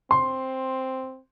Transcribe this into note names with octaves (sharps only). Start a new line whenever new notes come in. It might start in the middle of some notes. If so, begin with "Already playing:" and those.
C4 C6